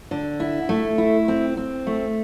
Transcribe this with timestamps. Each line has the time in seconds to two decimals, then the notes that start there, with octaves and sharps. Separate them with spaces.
0.11 D3
0.40 E4
0.69 A3
0.98 E4
1.28 C4
1.57 C4
1.87 A3